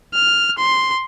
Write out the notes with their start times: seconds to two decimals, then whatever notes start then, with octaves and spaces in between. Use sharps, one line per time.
0.14 F6
0.57 C6